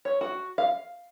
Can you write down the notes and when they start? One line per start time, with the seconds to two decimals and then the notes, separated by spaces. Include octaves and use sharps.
0.05 C#5
0.21 F#4
0.58 F5